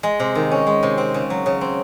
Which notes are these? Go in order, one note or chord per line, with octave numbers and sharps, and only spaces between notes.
G#3
C3
D#3
C#4
G#3
C3
C4
C#3
F#3
C#3
C4